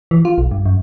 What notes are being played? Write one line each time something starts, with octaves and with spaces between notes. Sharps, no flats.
E3
F4
B1
G2
F#2